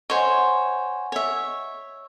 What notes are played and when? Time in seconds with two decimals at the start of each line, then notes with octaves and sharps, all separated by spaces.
0.10 C5 C#5 D#5 F#5 G#5
1.12 C#5 E5